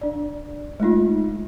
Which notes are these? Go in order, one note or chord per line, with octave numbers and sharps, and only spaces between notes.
D4 D5
G#3 A3 D#4 F4